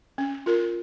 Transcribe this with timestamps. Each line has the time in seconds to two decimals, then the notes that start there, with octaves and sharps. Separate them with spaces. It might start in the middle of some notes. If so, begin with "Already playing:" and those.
0.18 C#4
0.46 F4 A#4